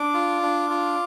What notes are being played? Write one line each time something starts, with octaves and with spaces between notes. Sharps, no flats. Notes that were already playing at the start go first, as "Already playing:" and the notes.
Already playing: D4 D6
F4
D4
F4